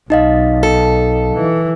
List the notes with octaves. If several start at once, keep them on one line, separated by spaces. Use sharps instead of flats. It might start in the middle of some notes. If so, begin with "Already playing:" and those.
B1 D#4 D#5 F5
A4
E3